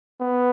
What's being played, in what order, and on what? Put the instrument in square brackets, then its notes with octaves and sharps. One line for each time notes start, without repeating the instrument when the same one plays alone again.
[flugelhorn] B3